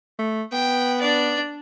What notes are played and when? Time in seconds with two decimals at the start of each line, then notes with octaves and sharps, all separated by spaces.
0.19 A3
0.52 B3 G5
1.00 D4 D5